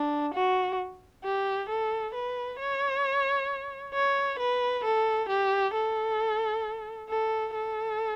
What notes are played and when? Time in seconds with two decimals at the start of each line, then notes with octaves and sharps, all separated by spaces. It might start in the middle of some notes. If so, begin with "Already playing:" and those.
Already playing: D4
0.34 F#4
1.24 G4
1.69 A4
2.14 B4
2.59 C#5
3.94 C#5
4.39 B4
4.84 A4
5.29 G4
5.74 A4
7.09 A4
7.55 A4